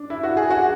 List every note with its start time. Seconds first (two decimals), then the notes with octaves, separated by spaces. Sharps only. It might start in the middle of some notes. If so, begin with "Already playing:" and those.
Already playing: D4
0.10 E4
0.23 F#4
0.37 G#4
0.50 F#4